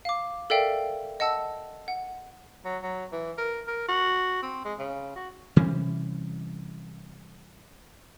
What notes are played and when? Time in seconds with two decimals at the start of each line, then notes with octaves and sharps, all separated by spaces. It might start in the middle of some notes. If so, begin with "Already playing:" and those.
0.05 F5 D6
0.50 A4 A#4 D5 E5 F5 G5
1.20 D#5 F#5 A5 E6
1.88 F#5
2.65 F#3
2.83 F#3
3.12 E3
3.38 A#4
3.67 A#4
3.88 F#4
4.42 C4
4.65 G#3
4.79 C#3
5.16 F#4
5.56 C3 E3 G3 C#4